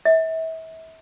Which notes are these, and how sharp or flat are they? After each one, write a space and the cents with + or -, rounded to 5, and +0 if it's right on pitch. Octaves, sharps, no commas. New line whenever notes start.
E5 -35